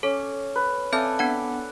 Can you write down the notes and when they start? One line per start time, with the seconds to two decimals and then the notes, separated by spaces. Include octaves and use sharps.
0.03 C#4 A4
0.56 B4
0.93 C4 A4 D5 E5 G#5 G6
1.19 B3 D4 F#5